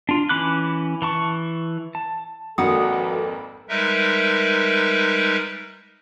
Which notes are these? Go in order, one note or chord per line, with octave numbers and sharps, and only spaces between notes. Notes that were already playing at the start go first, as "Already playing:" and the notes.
D4 F4
E3 C#4 B5 D6 F#6
E3 A5 C#6
A5
G#1 F2 A#3 F#4 A4 B4 F#5 D#6
G3 G#3 D#4 A#4 B4 E5